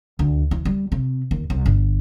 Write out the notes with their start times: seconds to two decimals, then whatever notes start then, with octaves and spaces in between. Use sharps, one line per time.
0.19 D2
0.51 E3
0.65 G3
0.92 C3
1.31 D#2
1.50 C2
1.66 G1